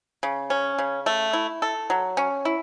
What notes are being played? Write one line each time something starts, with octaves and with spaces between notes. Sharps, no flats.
C#3
C#4
C#3
A3
E4
A4
F#3
C#4
E4